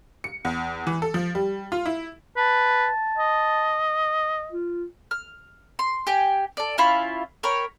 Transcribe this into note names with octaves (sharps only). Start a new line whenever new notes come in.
C#7
E2
E3
A4
F3
G3
F4
E4
B4 A5
D#5
F4
F6
C6
G4 G5 G#5
A4 D5
C#4 E4 F4 B5
A#4 C#5 G5 B5